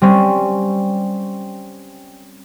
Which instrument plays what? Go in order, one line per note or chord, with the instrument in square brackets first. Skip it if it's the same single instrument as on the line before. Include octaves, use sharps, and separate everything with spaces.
[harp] G3 C4 C#4